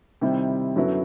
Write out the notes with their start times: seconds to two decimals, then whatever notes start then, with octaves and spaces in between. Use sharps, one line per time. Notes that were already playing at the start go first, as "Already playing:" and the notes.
0.21 C3 D#3 G3 C4 E4
0.76 F#2 D3 F#3 B3 E4